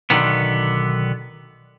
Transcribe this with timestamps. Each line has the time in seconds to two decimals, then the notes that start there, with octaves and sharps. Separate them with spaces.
0.10 B1 D3 D#3 B3